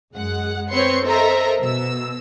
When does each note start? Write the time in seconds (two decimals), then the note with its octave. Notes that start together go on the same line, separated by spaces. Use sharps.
0.13 F#2 G#3 F#5
0.70 C4 B4 C#5 C6 C#7
1.06 A4 A#4 C5 D#5 E5 A#5
1.60 B2 E6